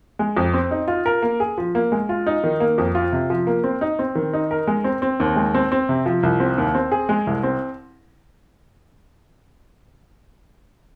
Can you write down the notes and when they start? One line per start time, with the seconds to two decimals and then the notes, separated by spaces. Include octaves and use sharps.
0.19 G#3
0.37 F2
0.54 C4
0.71 D#4
0.88 F4
1.06 A#4
1.22 A#3
1.40 G#4
1.58 F3
1.75 A#3
1.92 G#3
2.09 F4
2.27 D#4
2.44 D#3
2.60 A#3
2.78 F2
2.95 F4
3.13 C3
3.30 F3
3.47 A#3
3.64 C4
3.81 D#4
3.99 C4
4.15 D#3
4.33 D#4
4.51 A#4
4.67 G#3
4.84 C4
5.02 C4
5.20 D#2
5.36 G#3
5.54 C4
5.72 C4
5.89 C3
6.06 F3
6.23 C2
6.40 C4
6.58 D#2
6.75 C4
6.92 G#4
7.09 G#3
7.27 C2
7.43 C4